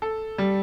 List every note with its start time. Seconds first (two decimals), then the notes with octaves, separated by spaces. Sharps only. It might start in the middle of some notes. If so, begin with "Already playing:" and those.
0.02 A4
0.38 G3